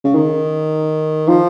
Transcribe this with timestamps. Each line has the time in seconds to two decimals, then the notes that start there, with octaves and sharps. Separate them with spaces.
0.04 C#3
0.15 D#3
1.28 F3